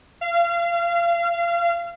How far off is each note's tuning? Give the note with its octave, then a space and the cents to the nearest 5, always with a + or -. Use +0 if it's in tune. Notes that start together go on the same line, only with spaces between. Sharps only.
F5 -30